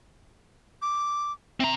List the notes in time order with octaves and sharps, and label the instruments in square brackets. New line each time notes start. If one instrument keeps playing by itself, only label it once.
[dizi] D6
[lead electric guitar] C4 A#5 [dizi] E5